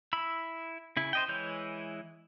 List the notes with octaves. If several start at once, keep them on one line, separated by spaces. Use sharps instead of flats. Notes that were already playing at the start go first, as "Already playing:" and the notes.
E4 B5 E6
C#3 E4
C5 D#5 G5
E3 G#3 E4 C#5 G6